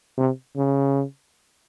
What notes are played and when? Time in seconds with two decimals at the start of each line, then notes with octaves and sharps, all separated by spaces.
0.18 C3
0.56 C#3